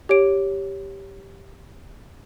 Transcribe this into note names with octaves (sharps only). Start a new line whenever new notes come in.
G4 C#5 D7